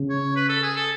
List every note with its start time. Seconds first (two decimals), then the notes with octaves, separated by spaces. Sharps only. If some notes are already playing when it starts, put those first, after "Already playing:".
Already playing: C#3
0.10 C#5
0.36 B4
0.49 A4
0.63 G#4
0.76 A4